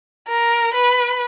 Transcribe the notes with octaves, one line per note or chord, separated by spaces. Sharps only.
A#4
B4